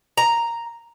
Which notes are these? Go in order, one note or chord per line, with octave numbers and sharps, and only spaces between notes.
A#5